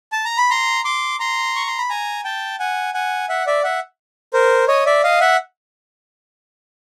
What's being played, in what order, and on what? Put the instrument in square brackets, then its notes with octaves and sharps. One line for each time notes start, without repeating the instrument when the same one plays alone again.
[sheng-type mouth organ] A5
A#5
B5
A#5 C6
C6 D6
A#5 C6
C#6
C6
B5
G#5 A#5
G5 A5
F#5 G#5
F#5 G#5
E5 F#5
D5 E5
E5 F#5
A#4 C5
C#5 D#5
D5 E5
D#5 F5
E5 F#5